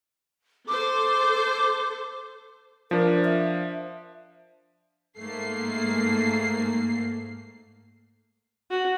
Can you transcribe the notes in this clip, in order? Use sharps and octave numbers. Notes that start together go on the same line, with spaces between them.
A4 C5 D6
F3 D4 A#4
E5
G#2 A3 A#3 C7
F#4